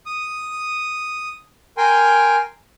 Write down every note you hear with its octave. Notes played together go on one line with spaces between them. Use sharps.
D#6
A#4 G5 G#5 C6